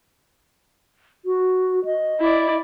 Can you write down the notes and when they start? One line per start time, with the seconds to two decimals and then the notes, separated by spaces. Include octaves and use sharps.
1.25 F#4
1.85 D#5
2.20 E4 D5